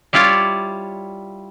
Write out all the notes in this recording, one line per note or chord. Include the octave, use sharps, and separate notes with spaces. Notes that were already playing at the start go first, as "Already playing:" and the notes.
G3 E4 F4 C#5 D5